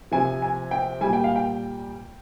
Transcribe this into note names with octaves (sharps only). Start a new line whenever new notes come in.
C3 F3 G#5
G#5
G5
A#2 G3 G#5
G5
F5
G5